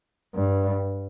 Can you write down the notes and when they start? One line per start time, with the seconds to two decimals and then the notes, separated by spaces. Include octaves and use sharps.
0.35 G2